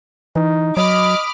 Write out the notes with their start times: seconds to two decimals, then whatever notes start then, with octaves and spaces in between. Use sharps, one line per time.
0.36 E3 D#4
0.77 F#3 D#5 B5 D6 D#6 F6